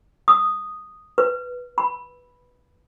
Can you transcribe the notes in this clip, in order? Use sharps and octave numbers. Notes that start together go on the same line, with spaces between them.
D#6
B4
B5